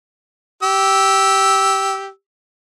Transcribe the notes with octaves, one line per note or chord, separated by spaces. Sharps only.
G4 E6